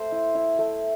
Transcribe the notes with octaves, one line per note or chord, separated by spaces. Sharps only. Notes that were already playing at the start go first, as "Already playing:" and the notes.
Already playing: A3 C5
E4
E4
A3